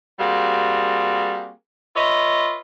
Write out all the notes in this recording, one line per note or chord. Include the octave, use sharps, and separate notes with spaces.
G3 A#3 C4 F#4 G#4
F4 B4 C#5 D#5 E5